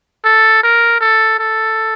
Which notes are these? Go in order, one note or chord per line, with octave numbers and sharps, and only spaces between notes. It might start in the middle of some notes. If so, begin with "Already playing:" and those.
A4
A#4
A4
A4